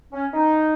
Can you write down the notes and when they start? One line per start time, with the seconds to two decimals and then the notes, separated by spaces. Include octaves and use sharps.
0.13 C#4
0.34 D#4